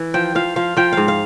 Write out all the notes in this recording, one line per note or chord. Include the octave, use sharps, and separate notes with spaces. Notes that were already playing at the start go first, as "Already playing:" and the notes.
Already playing: E3
F3 G5
F3 F5
F3 F5
F3 G5
G#2 F5
F5